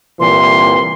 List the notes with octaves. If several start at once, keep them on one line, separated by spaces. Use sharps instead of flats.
C2 A#2 E3 C6